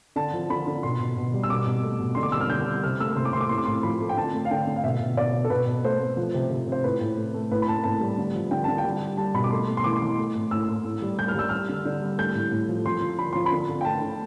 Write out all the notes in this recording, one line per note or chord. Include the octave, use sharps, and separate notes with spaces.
D3 A5
F3
D3 B5
D3
B2 C6
B2
B2
G3
E6
B2 D6
B2
A3
B2
D3 C6
D6
G3 E6
F6
D3 G6
G3
C3 F6
A3 E6
C3 C6
D6
C3 C6
D6
A2 C6
D6
A2 C6
F3 B5
A3
G5
D3 A5
A3
F5
D3 G5
D3
F5
B2 E5
B2
B2 D5
B2
A4
B2 B4
B2
A3 C5
A3
F3
C3
C3
C3 C5
A2 B4
A2
A3
A3
A2 B4
B5
A2 A5
A2 A5
G3
D3
F3
D3 G5
D3 A5
G5
G3
G3
G3 A5
B2 B5
D6
A3 C6
A3
C6
E3 D6
E3
A3
A2
A2 E6
A2
A2
G3
G3 G6
F6
G3 E6
G3 F6
D3
D3
G3
A3 G6
A2
A2
F3
F3 C6
F3
D3 B5
F3 C6
B5
D3
D3
G5
A3 A5
D3